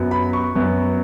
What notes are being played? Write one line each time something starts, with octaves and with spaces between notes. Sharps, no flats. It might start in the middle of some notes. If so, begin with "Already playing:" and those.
Already playing: F#2 F#3 B3
B5
C#6
F#2 F#3 B3